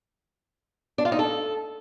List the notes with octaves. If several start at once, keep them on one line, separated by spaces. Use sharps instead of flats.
D4
F4
D#4
A4